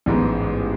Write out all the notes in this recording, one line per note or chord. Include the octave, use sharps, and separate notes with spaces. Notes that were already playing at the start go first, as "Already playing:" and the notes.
A1 G#2 G#3 B3